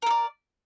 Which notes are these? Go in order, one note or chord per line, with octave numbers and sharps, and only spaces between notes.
A4 A#4 D5